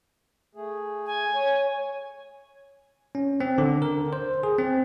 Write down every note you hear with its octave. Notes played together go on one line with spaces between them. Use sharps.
A3 G#4
G#5
C#5
C#4
C4
D3
A#4
C5
G#4
C4